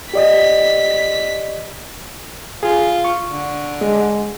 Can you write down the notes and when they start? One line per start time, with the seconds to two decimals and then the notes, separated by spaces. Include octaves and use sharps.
0.14 G4 D5 D#5 B6
2.63 F4 G#4
3.05 C#6
3.28 D3
3.81 G#3